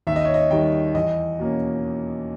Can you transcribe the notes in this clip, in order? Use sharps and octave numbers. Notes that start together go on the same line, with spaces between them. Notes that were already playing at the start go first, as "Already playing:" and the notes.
D#2 E5
D#5
C#5
D#5
D#3 G3 G5
E2 D#5
B2 A#3 C#4